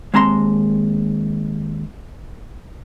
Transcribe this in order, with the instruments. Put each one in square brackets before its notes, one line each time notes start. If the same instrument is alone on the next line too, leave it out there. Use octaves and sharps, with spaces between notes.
[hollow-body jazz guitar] D#2 G#3 C4 A5 A#5 C6